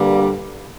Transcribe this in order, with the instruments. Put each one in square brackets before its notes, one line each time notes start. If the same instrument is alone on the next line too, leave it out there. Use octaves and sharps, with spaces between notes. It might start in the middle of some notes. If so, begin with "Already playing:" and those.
Already playing: [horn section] G2 D3 G3 A#3